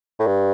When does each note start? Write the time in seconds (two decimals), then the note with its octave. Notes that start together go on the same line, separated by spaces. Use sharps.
0.20 A2
0.26 G2